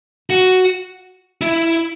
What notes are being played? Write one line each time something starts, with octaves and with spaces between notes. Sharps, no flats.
F#4
E4